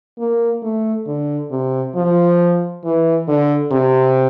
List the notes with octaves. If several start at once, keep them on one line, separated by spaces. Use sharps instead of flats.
A#3
A3
D3
C3
F3
E3
D3
C3